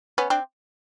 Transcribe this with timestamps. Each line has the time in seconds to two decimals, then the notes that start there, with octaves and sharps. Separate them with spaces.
0.18 B3 C#4
0.30 C4 D4